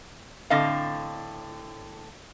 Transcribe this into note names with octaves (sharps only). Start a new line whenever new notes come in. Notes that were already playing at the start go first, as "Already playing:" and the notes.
A2 D3 C4 D#5 F5